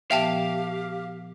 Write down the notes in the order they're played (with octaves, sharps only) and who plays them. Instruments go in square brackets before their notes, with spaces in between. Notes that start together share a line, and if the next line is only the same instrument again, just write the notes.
[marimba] A#2 F3 B3 [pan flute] G4 [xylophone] E5 G5 A5 [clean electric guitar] F5